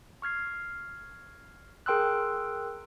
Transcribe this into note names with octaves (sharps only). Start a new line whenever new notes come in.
C#6 F6 G#6 C7
G#4 A#4 G5 C6 E6 F#6